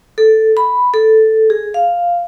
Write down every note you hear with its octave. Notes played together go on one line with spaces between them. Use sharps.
A4
B5
A4
G#4
F5